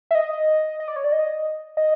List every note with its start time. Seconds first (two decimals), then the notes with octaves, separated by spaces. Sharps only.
0.11 E5
0.15 D#5
0.80 D#5
0.88 D5
0.96 C#5
1.04 D5
1.12 D#5
1.77 D#5